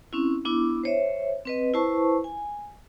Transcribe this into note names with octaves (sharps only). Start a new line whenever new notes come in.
C4 C#4 E4
B3 D4 E4 D6
C5 C#5 E5
C4 B4 D#5
E4 B4 C5 A5 C#6
G#5